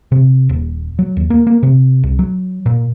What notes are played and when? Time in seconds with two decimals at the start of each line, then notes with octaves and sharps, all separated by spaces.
0.12 C3
0.49 D#1
0.99 F#3
1.17 D#2
1.30 A#3
1.47 A#3
1.63 C3
2.04 C2
2.19 F#3
2.66 A#2